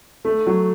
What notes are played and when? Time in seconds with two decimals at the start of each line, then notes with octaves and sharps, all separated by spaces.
0.25 A3
0.47 F#3